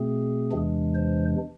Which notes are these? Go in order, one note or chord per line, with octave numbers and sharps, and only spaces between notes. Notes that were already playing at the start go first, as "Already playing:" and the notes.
Already playing: B2 A3 C4 G#4
E2 C3 E3 G#3 D4
C5